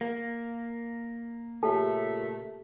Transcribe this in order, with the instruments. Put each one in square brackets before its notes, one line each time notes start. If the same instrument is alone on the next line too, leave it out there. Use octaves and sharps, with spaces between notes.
[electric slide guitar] A#3
[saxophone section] A#2 C#3 A3 [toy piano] G4 A4 A5